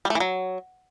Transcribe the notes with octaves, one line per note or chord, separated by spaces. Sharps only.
G3
A3
E3
F#3